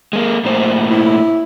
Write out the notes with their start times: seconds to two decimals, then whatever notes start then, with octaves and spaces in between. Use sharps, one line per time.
0.13 G#3 A#3
0.45 A2 A#3 C5
0.90 E4